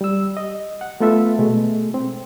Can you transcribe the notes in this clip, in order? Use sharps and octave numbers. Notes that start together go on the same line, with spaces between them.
G3 E6
D#5
F#5
A3 B3 F4 A4 B4 E5
B2 G#3 A3
C4